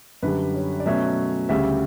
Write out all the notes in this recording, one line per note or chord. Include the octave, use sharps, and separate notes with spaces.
F#2 D3 G3 B4
C#5
D5
B2 F#3 A3 C#4 E5
D2 C#3 G3 E5